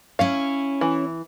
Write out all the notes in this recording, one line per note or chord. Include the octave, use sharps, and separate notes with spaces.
C#4 E4 C#5 F5
E3